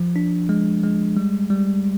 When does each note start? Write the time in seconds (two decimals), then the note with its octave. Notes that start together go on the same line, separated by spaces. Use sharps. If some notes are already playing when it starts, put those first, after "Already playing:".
Already playing: F3
0.16 D4
0.49 G#3
0.83 G#3
1.17 G3
1.50 G3